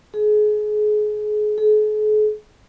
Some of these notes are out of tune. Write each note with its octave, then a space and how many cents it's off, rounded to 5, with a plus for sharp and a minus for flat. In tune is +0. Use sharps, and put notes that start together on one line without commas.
G#4 +30
G#4 +45